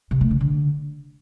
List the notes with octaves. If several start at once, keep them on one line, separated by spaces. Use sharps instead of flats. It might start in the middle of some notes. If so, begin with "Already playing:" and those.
C3
A3
C#3
D3